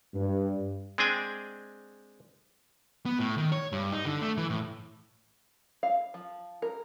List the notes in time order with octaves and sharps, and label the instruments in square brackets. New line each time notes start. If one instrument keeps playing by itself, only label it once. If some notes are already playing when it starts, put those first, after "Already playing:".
[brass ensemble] G2
[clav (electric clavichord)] G#3 C4 D4 G#4 G5 G#5
[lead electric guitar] B3
A2
D#3
C#5
G2
D#4
D3
A3
E3
A2
[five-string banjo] F5
F3
A#4